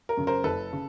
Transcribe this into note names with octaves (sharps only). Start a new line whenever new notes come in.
A#4
F#2 C#3
A#4 C5
F#1 A4 B4
C#3